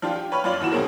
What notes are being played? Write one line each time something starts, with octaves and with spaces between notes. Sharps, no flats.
F3 D4 F4 G4
G4
B4 C#5 B5 C#6 F6
F#2 F4 C#5 D5 F#7
D#2 E3 F#4 E7
B2 D#3 F#3 C4 G#4 A#4